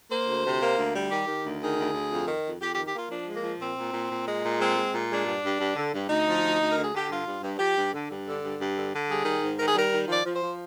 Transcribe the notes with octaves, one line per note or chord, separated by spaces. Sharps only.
A#3 C5
D2
C3
A#3
D2
G3
D#3 G4
D#3
D2
D#3 G#4
D2
D2
F2
D#3
F2
F2 G4
G4
D#3
G4
A#3 F4
F3 D4
G#3
A#3
F3
A#2 C4
A#2
A#2
A#2
G#3
A#2
G#3 C4
G#3
A#2
G#3 D4
G2
G2
G2
D3
G2
D2 D#4
F3
D2
D2
A#4
D3
G#4
D3 G4
G2 F4
G2
G2
F3 G4
G2
D3
G2
D3
G2
G2
D3
D3
G3 G#4
D#3
G#2
D#3 A#4
G#4
G3 A#4
D#3
F3 D5
F3
C5
F3